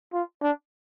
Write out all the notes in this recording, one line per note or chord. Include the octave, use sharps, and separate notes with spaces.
F4
D4